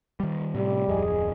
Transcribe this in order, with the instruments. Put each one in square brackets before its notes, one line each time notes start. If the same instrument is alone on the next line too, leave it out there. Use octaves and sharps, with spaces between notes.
[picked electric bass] D#3 G3
[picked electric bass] A2 C3 [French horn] G3
[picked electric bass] D1 F2 [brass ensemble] G#4 D#5